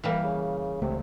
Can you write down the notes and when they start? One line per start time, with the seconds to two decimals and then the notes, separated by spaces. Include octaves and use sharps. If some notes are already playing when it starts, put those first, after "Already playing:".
0.04 E3 G3 A#3
0.24 C#3
0.82 C#2 C3 A3